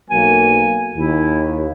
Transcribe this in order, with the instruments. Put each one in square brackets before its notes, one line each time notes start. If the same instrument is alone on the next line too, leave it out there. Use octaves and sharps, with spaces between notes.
[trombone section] B1 F#3 A#3 [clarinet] G#5
[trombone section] D#2 [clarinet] E4